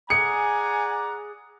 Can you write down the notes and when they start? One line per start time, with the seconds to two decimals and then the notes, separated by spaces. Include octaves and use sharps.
0.10 G#4 D5 F#5 G#5 A#5 C#7